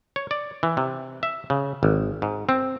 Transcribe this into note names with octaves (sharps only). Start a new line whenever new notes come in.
C#5
D5
E3
C3
E5
C#3
G#1
G#2
C4